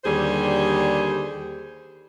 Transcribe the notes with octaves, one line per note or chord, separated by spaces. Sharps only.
D#2 D3 G3 G#4 C5